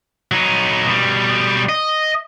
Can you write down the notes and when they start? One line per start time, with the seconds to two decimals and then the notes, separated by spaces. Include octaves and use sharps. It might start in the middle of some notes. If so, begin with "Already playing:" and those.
0.32 F#3 D#4
0.86 B2 G3
1.69 D#5